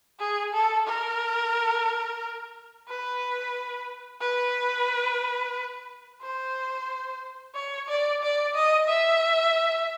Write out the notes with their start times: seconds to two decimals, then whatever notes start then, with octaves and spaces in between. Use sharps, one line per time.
0.19 G#4
0.53 A4
0.87 A#4
2.88 B4
4.21 B4
6.22 C5
7.55 C#5
7.88 D5
8.23 D5
8.55 D#5
8.89 E5